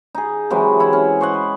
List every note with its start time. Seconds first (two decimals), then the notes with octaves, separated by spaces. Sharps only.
0.15 D#4 G#4
0.50 C3 E3 F#3 G#3
0.80 E4 F#5
0.93 C#4
1.21 C5 C#5 D#5 F#5
1.34 B4